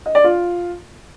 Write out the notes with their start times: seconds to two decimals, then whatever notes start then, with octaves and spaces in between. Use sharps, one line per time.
0.06 D#5
0.15 D5
0.24 F4